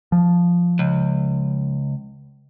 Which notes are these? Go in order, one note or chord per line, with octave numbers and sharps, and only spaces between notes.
F3
C#2